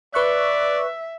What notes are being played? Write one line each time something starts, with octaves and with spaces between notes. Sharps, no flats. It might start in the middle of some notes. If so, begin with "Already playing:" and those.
B4 D5 E5 C#6 F#6